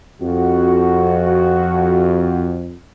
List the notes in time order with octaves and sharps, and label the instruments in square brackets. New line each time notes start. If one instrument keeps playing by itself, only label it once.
[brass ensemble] F2 [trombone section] F#4